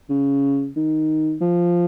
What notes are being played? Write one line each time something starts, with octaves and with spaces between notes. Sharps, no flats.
C#3
D#3
F3